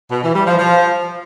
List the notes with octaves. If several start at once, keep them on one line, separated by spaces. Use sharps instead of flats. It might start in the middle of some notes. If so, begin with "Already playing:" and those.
B2
E3
G3
F3
F3